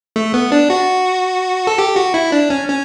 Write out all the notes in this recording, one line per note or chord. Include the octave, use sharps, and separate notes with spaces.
A3
B3
D4
F#4
A4
G4
F#4
E4
D4
C#4
C#4